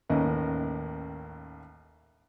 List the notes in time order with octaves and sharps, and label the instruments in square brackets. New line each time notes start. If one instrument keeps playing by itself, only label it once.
[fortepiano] A1 D#2 A#3 C#4 D#5